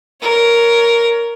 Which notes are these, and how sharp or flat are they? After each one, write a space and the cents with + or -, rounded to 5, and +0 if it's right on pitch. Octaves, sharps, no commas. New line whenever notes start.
A#4 +0 C#5 +20